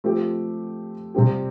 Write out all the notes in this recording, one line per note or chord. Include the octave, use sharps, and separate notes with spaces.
F3 A3 C4 G4
C3 G3 C4 G4